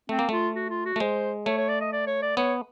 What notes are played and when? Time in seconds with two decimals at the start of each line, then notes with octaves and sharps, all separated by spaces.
0.09 A3 C4
0.19 A#3
0.29 A3 F4
0.56 F#4
0.70 F4
0.86 F#4
0.96 A3
1.00 G#3 C5
1.46 A3 C#5
1.57 C#5
1.69 D5
1.81 D#5
1.93 D5
2.07 C#5
2.22 D5
2.37 B3 C#5